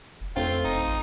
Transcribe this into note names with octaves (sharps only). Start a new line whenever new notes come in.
F#1
F2 A3 C4 F4 G5
F1 D#4
A1